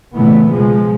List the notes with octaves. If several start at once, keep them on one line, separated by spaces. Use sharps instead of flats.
A#2 C#3 E3 A3 B3
B2 F3 G#3